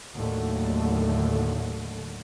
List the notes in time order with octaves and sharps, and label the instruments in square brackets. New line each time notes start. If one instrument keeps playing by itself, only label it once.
[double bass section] D#2 A2 D3 F#3 A3